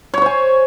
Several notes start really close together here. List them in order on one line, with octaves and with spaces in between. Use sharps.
C#5 C#6 C5 G#5